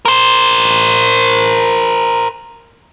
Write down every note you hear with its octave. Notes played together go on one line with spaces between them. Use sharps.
A#4 C5